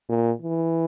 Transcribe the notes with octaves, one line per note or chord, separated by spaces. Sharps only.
A#2
E3